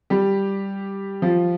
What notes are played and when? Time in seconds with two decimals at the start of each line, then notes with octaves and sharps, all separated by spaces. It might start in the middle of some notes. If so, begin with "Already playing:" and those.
0.10 G3 G4
1.22 F3 F4